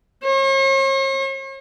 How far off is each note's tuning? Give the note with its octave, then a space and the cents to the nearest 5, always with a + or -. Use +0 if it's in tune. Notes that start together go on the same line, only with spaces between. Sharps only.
C#5 -45